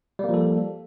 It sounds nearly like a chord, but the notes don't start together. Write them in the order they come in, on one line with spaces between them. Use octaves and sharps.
G3 A#3 F3 A4